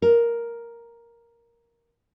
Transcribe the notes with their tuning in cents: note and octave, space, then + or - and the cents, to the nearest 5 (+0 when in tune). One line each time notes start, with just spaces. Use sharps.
A#4 +5